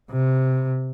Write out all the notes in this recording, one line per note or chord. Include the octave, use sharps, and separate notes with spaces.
C3